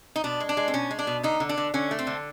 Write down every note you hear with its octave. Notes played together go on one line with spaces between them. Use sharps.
D#4
B2 D4
G#3
D4
G#3
C4
B2 C#4
G#3
D4
B2
D3 D#4
D3
D4
D3
D3 C#4
A3
C4
D3